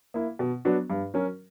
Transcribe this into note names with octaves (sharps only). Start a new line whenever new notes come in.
A#3 E4
B2
F#3 B3 D4 F#4
G2
F#3 C#4 F#4 A#4